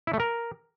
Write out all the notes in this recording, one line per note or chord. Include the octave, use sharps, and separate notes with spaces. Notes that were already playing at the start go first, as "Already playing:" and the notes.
E4
A3
A#4